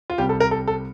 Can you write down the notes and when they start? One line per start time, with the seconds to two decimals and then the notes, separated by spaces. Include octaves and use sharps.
0.10 F4
0.18 C2 C3 G3 G4
0.29 A4
0.40 A#4
0.51 A4
0.68 A4